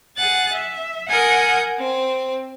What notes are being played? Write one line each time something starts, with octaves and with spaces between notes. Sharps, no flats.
G#4 F#5 F#6 A6
E5
A#4 F#5 G#5 D#6 G6
C4